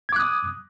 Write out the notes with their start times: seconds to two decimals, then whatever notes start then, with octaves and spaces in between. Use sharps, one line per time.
0.09 G#6
0.12 D6
0.16 F#6
0.20 D#6